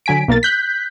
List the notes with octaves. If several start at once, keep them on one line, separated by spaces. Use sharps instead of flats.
D3 F#3 G#5 B6 D7
B1 A#3 A#4 A6
F#6 G6 B6